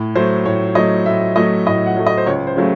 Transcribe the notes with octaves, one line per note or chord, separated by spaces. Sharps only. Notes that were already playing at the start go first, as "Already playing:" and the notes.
Already playing: A2
F#3 A3 C5
A2 C#5
F#3 A3 D#5
A2 E5
F#3 A3 D#5
A2 D#5
F#5
F#3 A3
D#5
C5
C#2 C#5
C5
C#3 F#3 A3